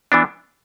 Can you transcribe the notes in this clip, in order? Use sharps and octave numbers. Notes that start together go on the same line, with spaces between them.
E3 B3 D4